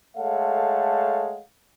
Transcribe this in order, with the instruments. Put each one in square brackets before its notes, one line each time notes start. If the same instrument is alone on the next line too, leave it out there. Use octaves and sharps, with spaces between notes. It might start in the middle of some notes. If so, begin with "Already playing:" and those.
[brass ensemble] G#3 A3 A4 C#5 F5 F#5